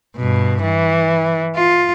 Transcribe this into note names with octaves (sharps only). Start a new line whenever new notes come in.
G2 B2
E3
F4